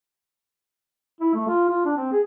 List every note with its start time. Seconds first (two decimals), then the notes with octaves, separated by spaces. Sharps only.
1.21 E4
1.34 A3
1.48 F4
1.69 F4
1.85 D4
1.97 C4
2.12 G#4